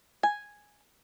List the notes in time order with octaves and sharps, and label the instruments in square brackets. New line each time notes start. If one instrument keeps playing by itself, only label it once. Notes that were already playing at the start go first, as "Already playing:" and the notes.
[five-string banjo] G#5